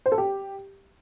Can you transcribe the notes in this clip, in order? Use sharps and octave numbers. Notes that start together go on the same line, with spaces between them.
C5
A4
G4